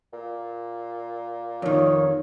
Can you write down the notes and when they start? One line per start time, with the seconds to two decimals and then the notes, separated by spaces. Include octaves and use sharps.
0.13 A#2
1.62 F2 D#3 C#5